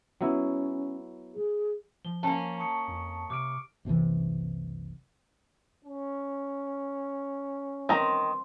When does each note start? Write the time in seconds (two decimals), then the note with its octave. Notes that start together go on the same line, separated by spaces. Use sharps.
0.21 F#3 B3 C#4 E4
1.34 G#4
2.05 F3 G7
2.23 A#3 C#4 A5
2.60 C#6 D#6 C#7
2.88 F2
3.30 C3 D6 F6 D7
3.85 F#1 C2 C3 E3
5.84 C#4
7.89 D#3 C4 A#5